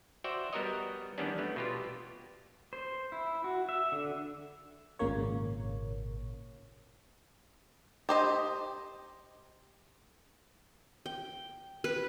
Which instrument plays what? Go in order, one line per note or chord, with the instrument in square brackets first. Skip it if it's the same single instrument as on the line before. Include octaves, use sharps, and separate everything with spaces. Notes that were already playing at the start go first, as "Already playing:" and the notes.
[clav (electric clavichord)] F#4 C5 D5 E5 G5
G3 B3 F#4 A#4 C#5 D#5
D#3 E3 G3 B3 C#4 D4
A3 B3
B2 F4 G4
[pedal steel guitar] C5
E4
F#4
E5
D3
[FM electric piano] G#1 A#2 C#3 A#3 C#5
[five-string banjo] G4 C5 D#5
[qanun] G5
B4